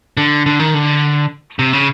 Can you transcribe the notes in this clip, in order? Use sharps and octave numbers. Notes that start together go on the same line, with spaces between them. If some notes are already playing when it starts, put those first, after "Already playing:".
D3
D3
D#3
D3
C3
C#3